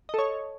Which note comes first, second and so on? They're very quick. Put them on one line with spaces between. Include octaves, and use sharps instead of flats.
D#5 A4 C#5